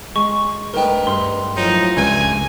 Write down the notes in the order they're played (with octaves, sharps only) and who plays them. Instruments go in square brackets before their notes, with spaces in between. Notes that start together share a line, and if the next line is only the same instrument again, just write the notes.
[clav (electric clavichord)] G#3 [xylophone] C#6
[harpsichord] D2 G#2 B3 [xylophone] A#4 G5
[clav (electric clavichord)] G2 [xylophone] C6
[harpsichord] A2 F3 F#3 [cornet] D#4
[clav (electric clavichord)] C#2 [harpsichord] G2 D3 A3 [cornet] G#5